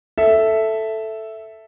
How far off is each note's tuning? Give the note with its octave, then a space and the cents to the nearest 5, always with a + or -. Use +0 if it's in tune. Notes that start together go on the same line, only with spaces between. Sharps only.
A4 +0 E5 +0